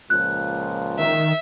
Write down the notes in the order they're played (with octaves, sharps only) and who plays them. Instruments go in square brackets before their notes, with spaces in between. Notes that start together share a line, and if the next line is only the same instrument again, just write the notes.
[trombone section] C#2 A#2 F3 [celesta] F#6
[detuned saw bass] D#3 [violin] E5